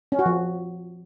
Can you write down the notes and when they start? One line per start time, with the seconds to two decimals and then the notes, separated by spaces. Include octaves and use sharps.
0.12 C#4
0.19 F#4
0.26 F3